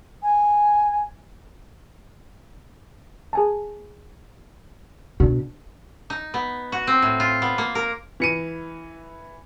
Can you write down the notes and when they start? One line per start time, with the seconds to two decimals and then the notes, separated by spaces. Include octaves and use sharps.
0.23 G#5
3.33 G#4 G#5 A5
5.20 B2 D4 F#4
6.10 D#4
6.34 B3
6.72 F#4
6.87 C4
7.02 A2
7.20 F4
7.42 B3
7.58 A#3
7.75 A#4
8.20 E3 C#7 D#7